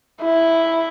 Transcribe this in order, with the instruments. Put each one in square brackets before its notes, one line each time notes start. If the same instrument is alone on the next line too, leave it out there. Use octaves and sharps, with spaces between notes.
[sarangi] E4